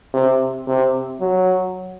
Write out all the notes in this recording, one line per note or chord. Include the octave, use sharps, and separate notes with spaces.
C3
C3
F#3